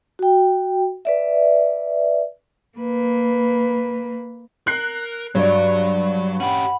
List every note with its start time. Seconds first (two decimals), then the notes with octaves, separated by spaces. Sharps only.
0.19 F#4 G5
1.05 B4 D5 E5
2.78 A#3 B4
4.67 A#4 F#6 C7
5.35 G2 F#3 C#5 D5
6.40 C#4 G4 F#5 B5